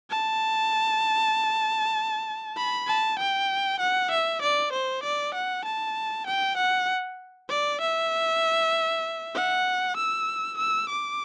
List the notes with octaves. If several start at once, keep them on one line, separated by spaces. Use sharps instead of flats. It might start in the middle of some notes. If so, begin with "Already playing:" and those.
A5
B5
A5
G5
F#5
E5
D5
C5
D5
F#5
A5
G5
F#5
D5
E5
F#5
E6
E6
D6